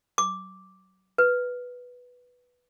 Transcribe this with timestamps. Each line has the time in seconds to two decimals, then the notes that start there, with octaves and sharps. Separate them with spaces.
0.18 D6
1.18 B4